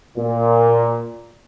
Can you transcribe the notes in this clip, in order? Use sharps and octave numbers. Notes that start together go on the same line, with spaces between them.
A#2